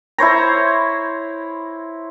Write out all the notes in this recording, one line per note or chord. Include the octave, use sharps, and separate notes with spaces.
E4 C5 C#5 A#5